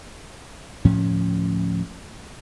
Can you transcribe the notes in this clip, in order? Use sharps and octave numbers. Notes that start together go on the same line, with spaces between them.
D2 A2 F3 C#4